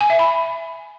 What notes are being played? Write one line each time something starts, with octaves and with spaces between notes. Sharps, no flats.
G#5
E5
B5